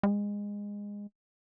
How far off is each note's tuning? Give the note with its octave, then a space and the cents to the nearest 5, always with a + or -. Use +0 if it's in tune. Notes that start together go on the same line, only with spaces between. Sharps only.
G#3 -20